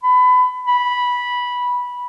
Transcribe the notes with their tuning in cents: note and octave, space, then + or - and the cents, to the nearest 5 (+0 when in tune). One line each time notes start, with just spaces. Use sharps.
B5 +25
B5 -10